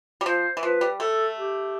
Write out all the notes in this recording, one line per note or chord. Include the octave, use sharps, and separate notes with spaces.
G3
F3 C5
E3
F3 B4
G3
A3 A4
G4